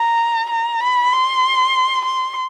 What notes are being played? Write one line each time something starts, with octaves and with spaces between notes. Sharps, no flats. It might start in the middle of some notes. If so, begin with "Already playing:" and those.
Already playing: A#5
A#5
B5
C6
C6